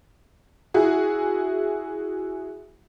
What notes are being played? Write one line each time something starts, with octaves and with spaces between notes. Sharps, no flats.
E4 F#4 G#4